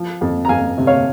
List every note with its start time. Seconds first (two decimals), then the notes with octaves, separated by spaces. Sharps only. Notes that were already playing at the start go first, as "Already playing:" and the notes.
Already playing: F3
0.21 F2
0.45 A#5
0.49 F2 F5 G#5
0.78 C3
0.87 C#5 F5